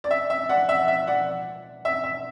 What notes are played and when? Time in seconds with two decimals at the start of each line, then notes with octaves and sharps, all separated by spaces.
0.04 D5
0.11 E5
0.30 E5
0.49 D5 F#5
0.69 E5
0.88 E5
1.07 D5 F#5
1.85 E5
2.04 E5